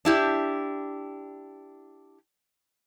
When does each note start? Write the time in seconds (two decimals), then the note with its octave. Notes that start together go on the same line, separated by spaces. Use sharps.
0.05 D4 E4 G4